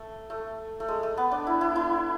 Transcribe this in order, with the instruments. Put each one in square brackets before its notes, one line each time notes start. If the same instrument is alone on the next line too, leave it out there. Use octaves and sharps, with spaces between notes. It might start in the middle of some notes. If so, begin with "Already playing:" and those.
Already playing: [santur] A3
A3
A3
G#3
A3
B3
D4
E4
E4
E4